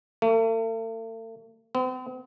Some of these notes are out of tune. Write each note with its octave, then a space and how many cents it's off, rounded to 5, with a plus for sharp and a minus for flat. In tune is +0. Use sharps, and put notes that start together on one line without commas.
A3 +45
C4 -45